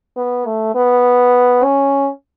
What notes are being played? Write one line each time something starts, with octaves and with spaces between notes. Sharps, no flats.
B3
A3
B3
C#4